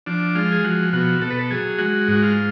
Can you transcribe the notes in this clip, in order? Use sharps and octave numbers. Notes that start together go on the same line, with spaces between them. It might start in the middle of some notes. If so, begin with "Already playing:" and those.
F3 D4
G#3 F4
G#4
F3 F#4
B2 F#4
B2 A4
B4
A4
F#3 G#4
G#3 F#4
G#2 F#4
F4